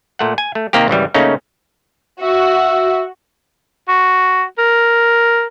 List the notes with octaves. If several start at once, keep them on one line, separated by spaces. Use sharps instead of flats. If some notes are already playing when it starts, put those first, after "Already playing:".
A#2 A3 F#5
G#5
A3
C3 D#3 A#3 C4 G4
G#1 C#3 E3 G3
C#3 A3 A#3 C#4 D#4
F#4 E5
F#4
A#4